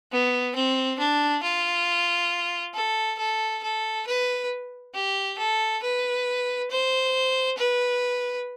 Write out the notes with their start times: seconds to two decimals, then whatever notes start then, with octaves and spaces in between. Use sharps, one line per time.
0.12 B3
0.55 C4
0.99 D4
1.43 F4
2.74 A4
3.18 A4
3.63 A4
4.07 B4
4.94 G4
5.38 A4
5.82 B4
6.70 C5
7.57 B4